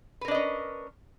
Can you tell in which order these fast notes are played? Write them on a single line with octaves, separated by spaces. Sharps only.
B4 A#4 D4 D#5 C#4